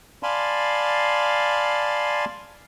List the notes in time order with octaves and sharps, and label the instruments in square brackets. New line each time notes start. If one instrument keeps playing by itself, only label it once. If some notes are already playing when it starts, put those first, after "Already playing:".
[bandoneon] D5 F5 G#5 A5 B5 C6